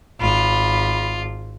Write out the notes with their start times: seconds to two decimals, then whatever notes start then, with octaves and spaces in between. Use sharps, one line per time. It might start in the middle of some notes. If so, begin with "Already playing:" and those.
0.20 G#1 F4 B5